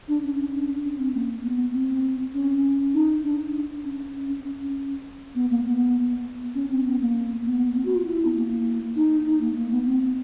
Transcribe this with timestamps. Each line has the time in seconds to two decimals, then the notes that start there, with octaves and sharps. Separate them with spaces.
0.08 D4
0.24 C#4
0.54 D4
0.84 C#4
0.98 C4
1.14 A#3
1.44 B3
1.73 C4
2.34 C#4
2.94 D#4
3.24 D4
3.84 C#4
4.29 C#4
4.45 C#4
5.35 B3
5.50 A#3
5.65 B3
6.55 C#4
6.70 C4
6.86 B3
7.01 A#3
7.46 B3
7.75 C4
7.85 F#4
7.95 F4
8.06 E4
8.26 B3
8.36 A#3
8.96 D#4
9.26 D#4
9.41 A#3
9.56 A#3
9.71 B3
9.86 C4